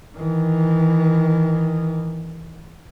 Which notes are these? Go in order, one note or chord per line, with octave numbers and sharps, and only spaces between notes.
D#3 E3